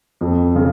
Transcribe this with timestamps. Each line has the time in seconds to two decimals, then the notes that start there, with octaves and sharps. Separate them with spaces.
0.21 F2
0.55 C#3